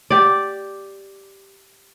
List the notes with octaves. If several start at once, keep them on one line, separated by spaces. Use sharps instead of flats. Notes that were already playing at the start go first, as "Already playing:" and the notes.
G4 D5